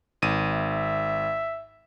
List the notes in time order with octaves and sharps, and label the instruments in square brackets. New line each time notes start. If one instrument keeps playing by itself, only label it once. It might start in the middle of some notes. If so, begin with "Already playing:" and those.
[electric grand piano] G#1 D#7
[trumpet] E5